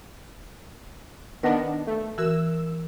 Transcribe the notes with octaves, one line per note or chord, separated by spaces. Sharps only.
D#3 B3 D4 B4 D#5 A#6
A3
E3 F#4 A#4 E6